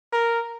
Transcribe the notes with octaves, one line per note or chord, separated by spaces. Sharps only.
A#4